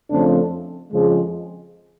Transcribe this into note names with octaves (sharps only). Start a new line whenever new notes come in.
F2 C#3 F3 A3 C4 D4
F2 C#3 F3 G#3